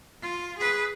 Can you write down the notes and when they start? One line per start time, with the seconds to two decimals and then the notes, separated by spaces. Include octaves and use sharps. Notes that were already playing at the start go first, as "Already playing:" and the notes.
0.22 F4
0.58 G#4 B4